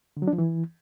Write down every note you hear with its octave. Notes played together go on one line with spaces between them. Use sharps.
D3
F#3
D4
F3
E3